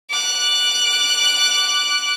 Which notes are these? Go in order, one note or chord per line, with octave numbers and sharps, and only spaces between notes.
D6 F#6